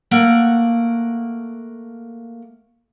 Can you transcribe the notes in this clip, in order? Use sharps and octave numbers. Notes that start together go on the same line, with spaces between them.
A3 A#3 F#5